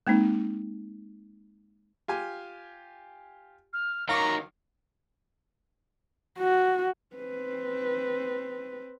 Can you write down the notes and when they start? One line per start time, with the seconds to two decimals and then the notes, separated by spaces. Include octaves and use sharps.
0.07 G#3 A#3 C4 D#4
2.08 F4 G4 G#5
3.73 F6
4.09 D#3 F#3 F5 A#5 C#6 D6
6.38 F#4
7.15 C4 B4